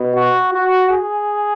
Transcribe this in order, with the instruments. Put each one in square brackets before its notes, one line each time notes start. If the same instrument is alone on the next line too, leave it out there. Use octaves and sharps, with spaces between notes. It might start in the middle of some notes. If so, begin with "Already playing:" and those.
Already playing: [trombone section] B2
F#4
F#4
G#4